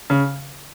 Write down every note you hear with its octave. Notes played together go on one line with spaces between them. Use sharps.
C#3